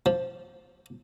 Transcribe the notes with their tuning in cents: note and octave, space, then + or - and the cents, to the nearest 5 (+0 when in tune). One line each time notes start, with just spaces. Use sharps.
F3 +5